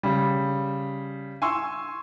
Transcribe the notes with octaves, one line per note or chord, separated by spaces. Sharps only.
C#3 G3
G#5 C6 C#6 E6